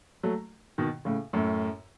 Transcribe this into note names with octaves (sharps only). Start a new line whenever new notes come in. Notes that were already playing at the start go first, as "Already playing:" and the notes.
F#3 A3
B2 D#3
A2 C#3
F#2 A2